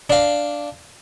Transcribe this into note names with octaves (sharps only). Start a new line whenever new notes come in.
D4 F5